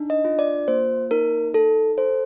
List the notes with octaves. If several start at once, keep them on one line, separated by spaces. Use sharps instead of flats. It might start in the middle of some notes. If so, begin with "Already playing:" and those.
Already playing: D4 D#4
D#5
F4
D5
A#3 C5
D#4 A#4
A4
A4 C5